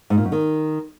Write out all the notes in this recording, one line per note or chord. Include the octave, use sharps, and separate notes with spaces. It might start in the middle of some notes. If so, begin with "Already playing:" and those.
G#2
A#2
F#2
D#3